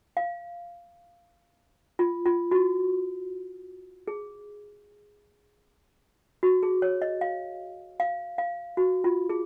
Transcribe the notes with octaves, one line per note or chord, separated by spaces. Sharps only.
F5
F4
F4
F#4
G#4
F#4
G#4
C#5
D#5
F5
F5
F5
F#4
F4
G#4